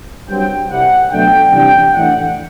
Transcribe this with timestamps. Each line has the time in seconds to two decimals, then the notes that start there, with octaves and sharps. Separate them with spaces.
0.27 G2 F#3 C4 G5
0.69 C2 C3 G3 F#5
1.10 B2 F#3 A3 D4 G5
1.52 C3 E3 G3 D4 G5
1.93 A2 E3 A3 D4 F#5